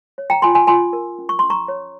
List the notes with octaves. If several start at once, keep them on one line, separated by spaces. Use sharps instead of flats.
C#5
G5 A#5
F4 G#5 C6
G#5 C6
F4 G#5 C6
A#4
C#4
C#6
C#4 C6
A#5 C#6
C#5